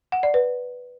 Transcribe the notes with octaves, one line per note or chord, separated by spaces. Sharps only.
F#5
D5
B4